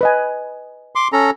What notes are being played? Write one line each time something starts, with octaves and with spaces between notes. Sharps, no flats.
B4 D#5 G#5
C6 D6
C#4 A4 A#5